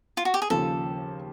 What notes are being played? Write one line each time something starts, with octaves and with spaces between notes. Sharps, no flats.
F4
F#4
G4
G#4
D#2 C#3 F3 A4